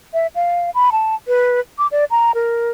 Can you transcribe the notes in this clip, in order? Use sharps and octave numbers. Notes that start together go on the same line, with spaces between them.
E5
F5
B5
A5
B4
D6
D5
A#5
A#4